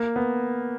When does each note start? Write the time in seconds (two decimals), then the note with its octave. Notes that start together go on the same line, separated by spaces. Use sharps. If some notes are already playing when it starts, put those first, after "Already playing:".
Already playing: A#3
0.16 B3